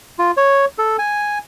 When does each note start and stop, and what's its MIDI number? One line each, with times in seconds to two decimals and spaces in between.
0.19 0.31 65
0.37 0.65 73
0.78 0.97 69
0.99 1.38 80